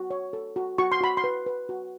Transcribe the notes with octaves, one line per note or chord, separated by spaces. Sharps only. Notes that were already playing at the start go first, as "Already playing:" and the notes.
Already playing: F#4
C#5
A4
F#4
F#4 C#6
C6
F#4 B5
C6
B4
B4
F#4